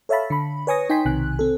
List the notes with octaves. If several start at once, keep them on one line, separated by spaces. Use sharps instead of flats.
A4 C#5 E5 F5 A5 B5
D3 B5
B4 C#5 G#5 C#6 D#6 A#6
D#4 G5 G#5 C6 B6
B1 C3 D#3 G#5 F#6
C4 A4